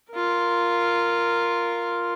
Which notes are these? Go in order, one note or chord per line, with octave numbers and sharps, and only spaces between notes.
F4 A#4